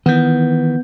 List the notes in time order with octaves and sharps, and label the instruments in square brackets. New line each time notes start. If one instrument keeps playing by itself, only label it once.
[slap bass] D#3 E3 [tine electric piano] B3 G6